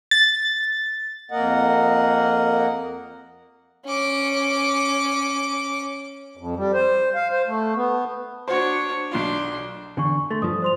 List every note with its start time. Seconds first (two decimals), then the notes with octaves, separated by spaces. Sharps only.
0.11 A6
1.31 F2 A#3 A#4 D#5 F#5
3.85 C#4 D6
6.37 F2
6.56 G3
6.73 C5
7.15 F5
7.31 C5
7.47 A3
7.75 B3
8.48 D4 F#4 C5 C#5
9.12 B1 D4 F4 C6
9.97 E2 D3 G#5 C#6
10.31 A3 D4 C6 A6
10.42 G2 F3 D#6
10.62 C5 C6 F7